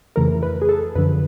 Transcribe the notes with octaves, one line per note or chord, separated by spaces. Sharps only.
F2 C#3 E3 A3 A#4
B4
G#4
A4
F#2 D3 F3 B4